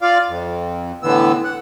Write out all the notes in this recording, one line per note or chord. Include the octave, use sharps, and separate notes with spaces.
F4 D5 F5
F2
A2 D3 E3 B3 E6
F#5